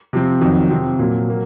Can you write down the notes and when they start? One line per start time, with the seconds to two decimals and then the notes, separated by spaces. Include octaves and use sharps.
0.13 C3 F3 C4
0.41 F2 D#3 F#3
0.70 C3 F3 C4
0.99 A#2 F#3 A#3
1.30 F#3 A#3